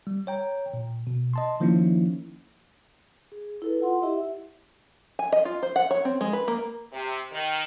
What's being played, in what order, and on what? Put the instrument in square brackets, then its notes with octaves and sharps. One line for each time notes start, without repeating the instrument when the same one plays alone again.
[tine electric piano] G3
C#5 G5 A#5
A#2
B2
D#5 A5 C6
D#3 F3 A#3 C#4 D#4 E4
[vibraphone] G#4
E4 A4 B4
F4 F#5 C6
E4 G4 D#5 E5
[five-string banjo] G#5
D#5
F4
C5
F#5
C#5
C4
G#3
B4
A#3
[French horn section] C3
D#3